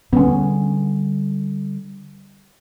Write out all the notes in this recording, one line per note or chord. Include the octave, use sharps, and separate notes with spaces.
D3 G3 B3 C#4